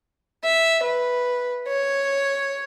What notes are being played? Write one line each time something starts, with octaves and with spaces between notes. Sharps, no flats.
E5
B4
C#5